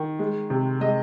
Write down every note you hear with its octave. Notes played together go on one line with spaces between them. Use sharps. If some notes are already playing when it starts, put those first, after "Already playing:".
Already playing: D#3
G#3
C3
G#3 D#5